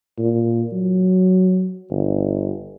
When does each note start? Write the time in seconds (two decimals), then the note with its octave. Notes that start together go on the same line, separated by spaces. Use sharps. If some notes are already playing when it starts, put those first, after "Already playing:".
0.19 A#2
0.72 F#3
1.91 G1